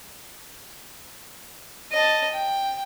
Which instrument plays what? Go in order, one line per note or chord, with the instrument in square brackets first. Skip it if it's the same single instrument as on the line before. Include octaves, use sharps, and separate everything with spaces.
[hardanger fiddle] D#5 A5
G5